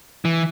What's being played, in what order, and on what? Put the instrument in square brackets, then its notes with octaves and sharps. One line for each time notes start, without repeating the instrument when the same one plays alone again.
[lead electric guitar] E3